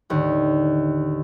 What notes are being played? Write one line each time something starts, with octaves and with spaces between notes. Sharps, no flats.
D#2 A2 D3